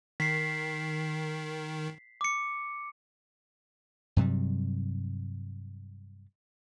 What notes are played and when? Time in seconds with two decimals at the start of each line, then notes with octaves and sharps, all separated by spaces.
0.20 D#3 B6 C7
2.21 D6 C#7
4.16 G2 C3 F#3 G3